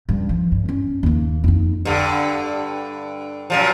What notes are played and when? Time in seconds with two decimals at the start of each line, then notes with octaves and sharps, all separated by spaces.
0.09 C#2 G2
0.29 F3
0.52 G2
0.65 G2 C#4
1.03 D#2 A#3
1.44 F2 D#4
1.85 G2 D3
3.50 F#2 A#2 F3